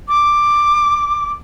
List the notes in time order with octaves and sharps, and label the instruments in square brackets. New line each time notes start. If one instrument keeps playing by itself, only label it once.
[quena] D6